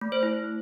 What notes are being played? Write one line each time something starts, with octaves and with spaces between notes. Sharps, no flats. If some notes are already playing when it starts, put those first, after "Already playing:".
A3
C5
E4